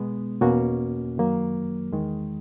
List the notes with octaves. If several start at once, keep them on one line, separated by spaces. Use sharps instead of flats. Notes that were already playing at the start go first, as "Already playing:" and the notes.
Already playing: B2 G#3 B3
E2 B2 A#3 C#4 F#4
F#2 D#3 F#3 A#3
E2 D#3 G#3